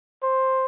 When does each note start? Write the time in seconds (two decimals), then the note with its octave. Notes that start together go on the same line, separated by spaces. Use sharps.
0.23 C5